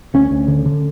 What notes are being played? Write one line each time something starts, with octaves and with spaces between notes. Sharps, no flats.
D2 C#4
D2
D3
D3